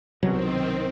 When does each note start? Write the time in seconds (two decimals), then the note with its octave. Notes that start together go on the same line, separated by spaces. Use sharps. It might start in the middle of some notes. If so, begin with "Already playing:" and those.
0.23 C2 B2 D#3 F#3 C4